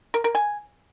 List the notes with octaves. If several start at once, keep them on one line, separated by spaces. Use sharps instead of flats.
A#4
A#4
G#5